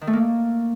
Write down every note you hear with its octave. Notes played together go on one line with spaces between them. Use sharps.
D#3
A3
A#3